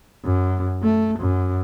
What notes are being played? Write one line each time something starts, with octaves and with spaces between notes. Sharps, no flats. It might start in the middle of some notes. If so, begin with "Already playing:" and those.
F#2
A3
F#2